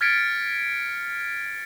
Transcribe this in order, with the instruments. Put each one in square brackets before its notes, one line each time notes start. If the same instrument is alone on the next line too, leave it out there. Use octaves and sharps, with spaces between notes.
[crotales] F6 G#6 A6 B6 C#7 D7